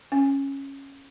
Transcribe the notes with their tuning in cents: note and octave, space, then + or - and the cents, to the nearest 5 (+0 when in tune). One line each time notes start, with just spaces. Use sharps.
C#4 -10